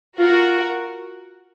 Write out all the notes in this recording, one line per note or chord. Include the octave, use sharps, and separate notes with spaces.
F4 F#4 A#4